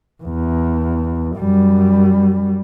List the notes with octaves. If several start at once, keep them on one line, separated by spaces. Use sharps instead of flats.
E2
F#2 G3